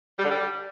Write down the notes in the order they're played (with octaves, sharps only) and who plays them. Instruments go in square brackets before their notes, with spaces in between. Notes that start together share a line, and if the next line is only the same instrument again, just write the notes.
[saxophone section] G3
D3
G3